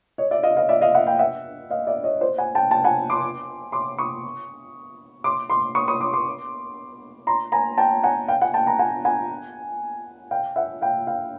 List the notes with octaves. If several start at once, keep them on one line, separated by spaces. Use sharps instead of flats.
C#5 D#5
D5 E5
D#5 F5
D#5 F5
D5 E5
D#5 F5
E5 F#5
F5 G5
E5 F#5
D#5 F5
D5 E5
C#5 D#5
C5 D5
F#5 G#5
G5 A5
G5 A5
F#5 G#5
C6 D6
C6 D6
C#6 D#6
C6 D6
C6 D6
C#6 D#6
C#6 D#6
C6 D6
C6 D6
A#5 C6
G#5 A#5
G5 A5
F#5 G#5
F5 G5
F#5 G#5
G5 A5
G#5 A#5
F#5 G#5
F#5 G#5
F5 G5
E5 F#5
F5 G5
F5 G5